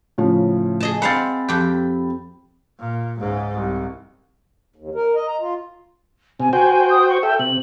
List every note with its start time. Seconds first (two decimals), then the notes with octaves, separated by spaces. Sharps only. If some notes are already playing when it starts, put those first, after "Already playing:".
0.18 A2 C#3 F3
0.80 G#4 D#5 A5
1.02 C4 F5 F#5 B5 A6
1.48 F2 G4
2.79 A#2
3.18 C#2 G#2
3.54 C2
4.76 D#2
4.95 A#4
5.15 D#5
5.28 A#5
5.41 F4
6.40 C3 G#5
6.53 F#4 C5 G5 G#5
6.90 D#6
7.09 C#6
7.23 A4 E5 G5
7.39 C3 F#7